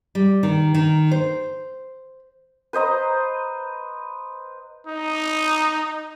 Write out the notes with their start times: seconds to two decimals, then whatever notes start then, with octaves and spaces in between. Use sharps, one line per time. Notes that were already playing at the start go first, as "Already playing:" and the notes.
0.15 G3
0.43 D#3
0.74 D#3
1.11 C5
2.73 B4 C5 D#5 A#5
4.87 D#4